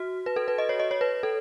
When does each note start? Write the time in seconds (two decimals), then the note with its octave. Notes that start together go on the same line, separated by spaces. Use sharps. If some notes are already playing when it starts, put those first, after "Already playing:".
Already playing: F#4
0.26 B4
0.36 A4
0.48 B4
0.58 D#5
0.69 C#5
0.80 D#5
0.91 C#5
1.01 B4
1.23 A4